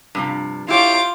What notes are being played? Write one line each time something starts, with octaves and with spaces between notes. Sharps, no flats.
G2 C3 F3
E4 F4 G4 C#5 D6